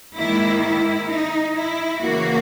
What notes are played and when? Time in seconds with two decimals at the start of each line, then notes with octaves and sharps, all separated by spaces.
0.17 G#2 D#3 A#3 E4
0.63 E4
1.11 D#4
1.57 E4
2.03 C#3 E3 A#3 F#4